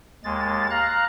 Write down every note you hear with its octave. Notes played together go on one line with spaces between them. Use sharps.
D#2 G#3 A6
F5 A#5 F#6